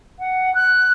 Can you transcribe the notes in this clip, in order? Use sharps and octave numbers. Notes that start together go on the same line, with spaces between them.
F#5
F#6